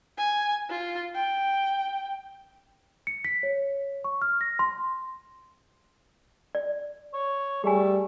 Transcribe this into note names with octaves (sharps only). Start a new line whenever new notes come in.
G#5
F4
G5
C#7
B6
C#5
C#6
F6
A#6
C6
D5
C#5
G3 A3 G#4 G#5